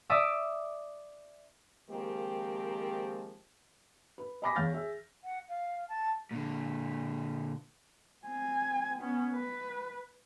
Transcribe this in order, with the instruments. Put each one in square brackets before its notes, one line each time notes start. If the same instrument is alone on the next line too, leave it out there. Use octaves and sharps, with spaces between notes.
[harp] D5 E5 D6 D#6
[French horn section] D#3 F3 G#3 A#3 C4 G4
[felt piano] B4
D#5 G#5 B5 D6 A#6 B6
E2 C#5 F5 F6 G6 A6
G#4 E5
[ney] F#5
F5
A5
[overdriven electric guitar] A#2 D3
[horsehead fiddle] C4 G#5
B3 C#4
B4